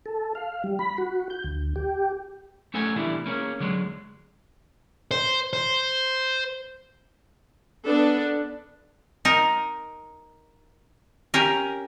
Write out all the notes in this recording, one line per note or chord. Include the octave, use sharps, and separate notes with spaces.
A4
F5
G3
B5
F#4
G6
D2
G4
A3 C#4 A4 F#5 G#5
B2 D3 E3 G3 E4
A#3 C#4 G#4
D3 F#3 G#3
C5
C5
B3 D4 A4 B4
D#4 A#4
C#4 G4 A#4